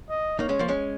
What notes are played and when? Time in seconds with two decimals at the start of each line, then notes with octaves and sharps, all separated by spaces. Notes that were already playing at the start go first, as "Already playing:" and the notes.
0.10 D#5
0.39 A#3 D#4 C#5
0.49 G#3 C#4
0.59 F3 A#3
0.68 G#3 C#4